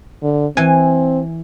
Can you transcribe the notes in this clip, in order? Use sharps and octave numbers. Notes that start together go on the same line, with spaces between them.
D3
E3 C4 G#5